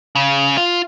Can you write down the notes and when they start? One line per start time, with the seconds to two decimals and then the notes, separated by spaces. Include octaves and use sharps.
0.15 C#3
0.58 F4